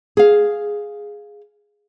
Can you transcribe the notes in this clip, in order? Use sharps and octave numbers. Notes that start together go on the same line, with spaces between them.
G#4 F5